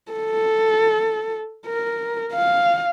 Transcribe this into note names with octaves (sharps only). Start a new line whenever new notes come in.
A4
A#4
F5